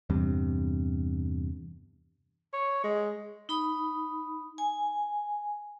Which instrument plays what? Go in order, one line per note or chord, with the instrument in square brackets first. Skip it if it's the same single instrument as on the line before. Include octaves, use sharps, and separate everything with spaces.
[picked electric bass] E2 G2 C3
[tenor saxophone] C#5
G#3
[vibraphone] D#4 B5 D#6
G#5